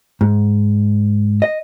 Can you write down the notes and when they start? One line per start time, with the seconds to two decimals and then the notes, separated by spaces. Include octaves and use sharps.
0.21 G#2
1.42 D#5